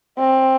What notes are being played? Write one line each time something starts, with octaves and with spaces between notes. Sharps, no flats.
C4